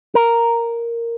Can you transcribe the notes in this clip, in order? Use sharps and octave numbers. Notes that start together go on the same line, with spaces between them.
A#4